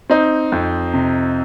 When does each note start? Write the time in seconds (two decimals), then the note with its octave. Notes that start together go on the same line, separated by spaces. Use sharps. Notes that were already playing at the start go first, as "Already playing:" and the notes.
0.10 C4 D#4
0.52 F2
0.94 C3